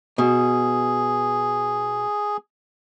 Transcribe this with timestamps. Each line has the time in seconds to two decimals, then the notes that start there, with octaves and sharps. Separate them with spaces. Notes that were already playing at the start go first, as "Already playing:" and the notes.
0.18 B2 G#4